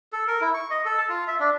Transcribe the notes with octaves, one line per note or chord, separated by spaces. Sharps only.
A4
A#4
E4
C#6
D#5
A4
A5
F4
E5
D4